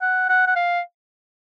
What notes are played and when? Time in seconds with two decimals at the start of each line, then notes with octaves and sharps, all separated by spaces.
0.02 F#5
0.29 F#5
0.47 F#5
0.56 F5